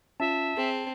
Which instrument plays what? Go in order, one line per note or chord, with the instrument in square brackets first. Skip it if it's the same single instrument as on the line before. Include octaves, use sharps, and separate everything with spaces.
[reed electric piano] C#4 F4 [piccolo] E5 [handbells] A5
[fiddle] C4 [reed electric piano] G#4